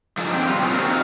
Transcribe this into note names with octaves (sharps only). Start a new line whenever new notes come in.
D3 F3 D4 D#4 G#4 A4
F2 G3 C4 D4 G5
G3 F4
C4 D4 F4 F#4 G#4 C#5
C4 D4 D#4 F#4 G#4 A#4
F2 D#4 F5